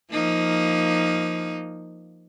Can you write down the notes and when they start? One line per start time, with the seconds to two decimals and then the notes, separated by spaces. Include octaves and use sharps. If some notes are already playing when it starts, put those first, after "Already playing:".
0.12 F3 A#3 D#4